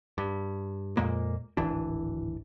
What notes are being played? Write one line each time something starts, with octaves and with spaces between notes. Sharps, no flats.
G2
F2 A#2 G#3 A#3
D1 G#1 E3 D4